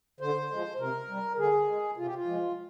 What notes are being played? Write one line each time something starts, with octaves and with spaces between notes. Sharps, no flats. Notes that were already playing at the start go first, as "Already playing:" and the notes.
D3 C5
F3 G#3
C3 A#4
G3
D3 G#4
G#3
C3 F4
G4
F4
F3 G#3